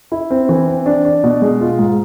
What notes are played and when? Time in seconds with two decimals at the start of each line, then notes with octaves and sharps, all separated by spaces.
0.12 E4
0.31 C4
0.49 E3
0.68 C4
0.86 D4
1.05 D4
1.24 B2
1.42 G#3
1.61 F4
1.79 G#2